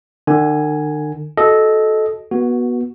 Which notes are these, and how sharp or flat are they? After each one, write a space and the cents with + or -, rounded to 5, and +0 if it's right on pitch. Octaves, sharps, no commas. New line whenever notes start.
D3 +45 G#5 +0
F#4 +5 A4 -15 D#5 +0
B3 -25 F#4 +0